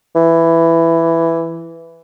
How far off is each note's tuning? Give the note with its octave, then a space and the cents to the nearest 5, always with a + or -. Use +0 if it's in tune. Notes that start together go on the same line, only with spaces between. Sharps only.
E3 +10